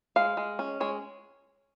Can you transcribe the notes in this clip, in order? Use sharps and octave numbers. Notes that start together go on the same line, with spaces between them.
G#3 F5
G#3
C#4
G#3 C#5